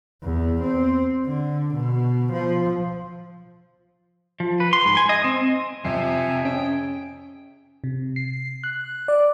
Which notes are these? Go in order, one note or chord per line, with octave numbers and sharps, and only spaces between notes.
E2
C4
D3
B2
F3
F3
B4
C6
G#2
G#5
D#5
C4
F2 C3 E5 G#5 C7
C#4 G#4 G5
C3
C7
F#6
D5